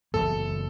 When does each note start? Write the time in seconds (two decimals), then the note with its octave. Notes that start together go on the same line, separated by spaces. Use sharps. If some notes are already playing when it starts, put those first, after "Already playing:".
0.14 F#1 F#2 E3 B3 A4